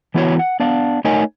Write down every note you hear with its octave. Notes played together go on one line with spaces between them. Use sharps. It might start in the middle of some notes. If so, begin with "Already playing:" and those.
E3 B3 E4 F#4 C#5
F#5
B3 D4 D5 F5
A3 D#4 A#4 C#5 D#5 G#5